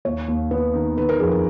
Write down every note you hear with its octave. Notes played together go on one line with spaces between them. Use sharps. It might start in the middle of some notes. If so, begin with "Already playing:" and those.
D#2 C#5
D#2
B3 B4
D#3
D#3 B4
A#4
F2 G#4
A#4